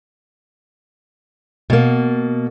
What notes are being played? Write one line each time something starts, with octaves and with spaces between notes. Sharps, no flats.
B2 A#3